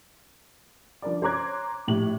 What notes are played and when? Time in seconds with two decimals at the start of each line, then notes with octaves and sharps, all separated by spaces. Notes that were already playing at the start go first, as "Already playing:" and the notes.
1.02 F3 D4 A#4 D5
1.22 C5 C#5 A#5 D6 F#6 G#6
1.87 A#1 A2 G4 F#7